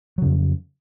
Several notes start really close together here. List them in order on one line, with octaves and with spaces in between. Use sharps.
F#3 C#3 F2